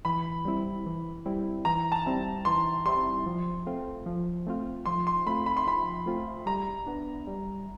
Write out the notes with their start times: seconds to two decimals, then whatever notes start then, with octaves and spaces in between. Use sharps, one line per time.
0.05 E3 B5
0.45 G3 C4 E4
0.86 E3
1.26 G3 C4 E4
1.65 E3 A#5
1.92 A5
2.06 G3 C4 E4
2.45 E3 C6
2.85 G3 C4 E4 C6
3.26 F3
3.67 A3 C4 F4
4.06 F3
4.47 A3 C4 F4
4.86 F3 C6
5.07 C6
5.27 A3 C4 F4 B5
5.46 B5
5.57 C6
5.67 F3 B5
6.06 A3 C4 F4
6.46 G3 A#5
6.86 B3 D4
7.27 G3